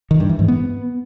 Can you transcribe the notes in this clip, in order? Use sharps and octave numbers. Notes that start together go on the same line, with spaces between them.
D#3
G2
E3
G#2
B3